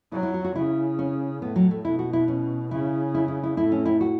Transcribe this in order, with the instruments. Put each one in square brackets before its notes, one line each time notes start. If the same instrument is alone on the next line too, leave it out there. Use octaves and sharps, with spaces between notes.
[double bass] F#3 [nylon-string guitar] E4
[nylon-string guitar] E4
F#4
F#4
[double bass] C#3 [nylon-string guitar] E4
[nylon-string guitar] C#4
[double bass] A2 [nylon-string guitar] B3
[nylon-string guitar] F#3
A3
[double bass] B2 [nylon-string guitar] E4
[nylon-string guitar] F#4
E4
C#4
[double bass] C#3 [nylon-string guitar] E4
[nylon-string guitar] E4
E4
E4
[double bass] A2 [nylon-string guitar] E4
[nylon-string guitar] C#4
E4
F#4